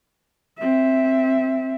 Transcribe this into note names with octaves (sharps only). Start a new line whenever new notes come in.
C4 E5